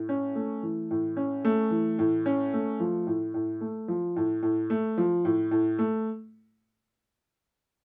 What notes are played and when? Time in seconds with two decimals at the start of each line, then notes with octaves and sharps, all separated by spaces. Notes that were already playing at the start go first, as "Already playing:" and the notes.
Already playing: A2
0.09 C#4
0.35 A3
0.63 E3
0.91 A2
1.17 C#4
1.45 A3
1.71 E3
1.99 A2
2.26 C#4
2.53 A3
2.80 F3
3.07 A2
3.34 A2
3.61 A3
3.88 F3
4.16 A2
4.43 A2
4.70 A3
4.98 F3
5.25 A2
5.51 A2
5.79 A3